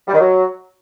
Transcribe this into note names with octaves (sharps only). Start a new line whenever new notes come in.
G3
D#3
F#3